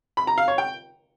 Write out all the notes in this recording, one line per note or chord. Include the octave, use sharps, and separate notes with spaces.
B5
A#5
F5
C#5
G5